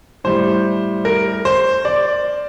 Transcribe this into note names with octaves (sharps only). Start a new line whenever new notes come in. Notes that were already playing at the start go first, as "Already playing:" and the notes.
A2 G3 C5
A#4
C5
D5